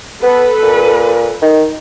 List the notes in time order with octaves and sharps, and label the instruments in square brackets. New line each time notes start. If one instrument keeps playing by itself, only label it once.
[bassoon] B3 [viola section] A4 B4
[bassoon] A#2
D#3